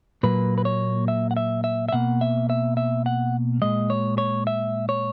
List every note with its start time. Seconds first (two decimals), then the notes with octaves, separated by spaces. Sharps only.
0.23 A#2 F#3 A#3 B4
0.58 B4
0.65 C#5
1.08 E5
1.31 F#5
1.37 E5
1.64 E5
1.89 E5
1.93 B2 A#3 F#5
2.21 E5
2.50 E5
2.77 E5
3.06 F#5
3.62 A#2 G#3 D#5
3.90 C#5
4.18 C#5
4.47 E5
4.89 C#5